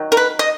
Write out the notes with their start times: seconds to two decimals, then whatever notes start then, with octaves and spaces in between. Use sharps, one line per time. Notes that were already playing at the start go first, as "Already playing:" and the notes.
Already playing: D#3 F#3
0.12 A#4
0.17 B4
0.39 D#5